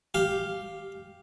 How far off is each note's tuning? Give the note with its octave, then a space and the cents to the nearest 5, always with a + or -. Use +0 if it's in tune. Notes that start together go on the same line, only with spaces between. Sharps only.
G4 +0 F5 +0